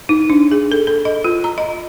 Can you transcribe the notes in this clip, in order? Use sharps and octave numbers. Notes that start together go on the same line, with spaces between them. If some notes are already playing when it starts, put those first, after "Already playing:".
D#4
D4
G#4
A4
A4
D#5
F4
A#5
D#5